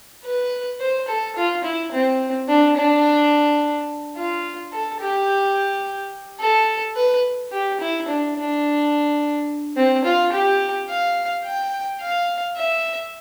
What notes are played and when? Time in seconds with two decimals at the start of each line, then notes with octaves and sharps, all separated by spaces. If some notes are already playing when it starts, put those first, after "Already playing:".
0.24 B4
0.80 C5
1.08 A4
1.36 F4
1.64 E4
1.92 C4
2.48 D4
2.77 D4
4.16 F4
4.72 A4
5.01 G4
6.40 A4
6.96 B4
7.53 G4
7.81 E4
8.08 D4
8.37 D4
9.76 C4
10.05 F4
10.32 G4
10.89 F5
11.45 G5
12.01 F5
12.57 E5